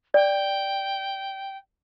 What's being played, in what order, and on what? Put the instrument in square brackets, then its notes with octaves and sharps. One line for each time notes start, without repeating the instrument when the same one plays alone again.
[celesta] D5 [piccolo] G5